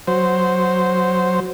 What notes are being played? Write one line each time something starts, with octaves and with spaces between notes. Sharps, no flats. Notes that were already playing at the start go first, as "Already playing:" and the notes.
F#3 C5